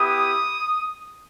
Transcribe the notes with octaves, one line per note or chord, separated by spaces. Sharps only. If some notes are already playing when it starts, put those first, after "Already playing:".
Already playing: B3 E4 G4 D#6